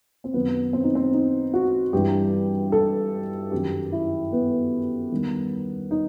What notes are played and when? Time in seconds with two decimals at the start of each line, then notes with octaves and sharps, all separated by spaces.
0.24 C4
0.34 F#2 D#3 F#3 B3
0.73 C4
0.84 D#4
0.95 C4
1.13 D#4
1.54 F#4
1.92 G2 E3 G3 G4
2.72 A4
3.52 F#2 D#3 F#3 G4
3.92 E4
4.32 B3
5.11 E2 D#3 G3
5.91 D#4